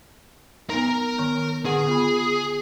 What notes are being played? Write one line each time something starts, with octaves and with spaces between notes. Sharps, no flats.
B3 D#4 A#4 A#5
D#3 B3
D3 G#4 F#5 C#6
B3 F4 B5